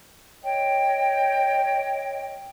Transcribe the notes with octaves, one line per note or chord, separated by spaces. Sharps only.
C#5 D#5 G5